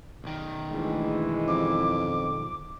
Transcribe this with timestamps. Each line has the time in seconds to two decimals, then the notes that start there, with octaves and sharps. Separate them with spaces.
0.24 B1 D#3
0.72 D2 E3 G#3
1.47 F2 D6